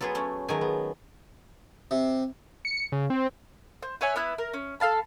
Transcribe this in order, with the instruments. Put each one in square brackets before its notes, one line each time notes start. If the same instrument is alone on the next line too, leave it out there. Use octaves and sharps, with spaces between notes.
[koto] F#3 B3 G#4 [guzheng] F4 A4 B4
[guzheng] A3 C#4
[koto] D#3 F#3 G#5 [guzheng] G#3 A3
[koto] B3
[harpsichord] C3
[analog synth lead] C#7
C#3
C4
[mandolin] C5
B4 C#5 E5 G#5
B3 E4 F#6
A#4
C#4
A4 F5 A5 B5